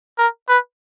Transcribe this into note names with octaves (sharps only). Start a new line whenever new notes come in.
A#4
B4